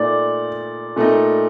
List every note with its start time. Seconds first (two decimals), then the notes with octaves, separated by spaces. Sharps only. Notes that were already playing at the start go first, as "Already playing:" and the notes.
Already playing: A#2 A3 D#4 D5
0.96 A#2 A3 D#4